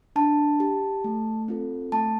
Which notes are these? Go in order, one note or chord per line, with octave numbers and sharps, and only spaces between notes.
D4 A5
G4
A3
C4 F4 A4
A3 A5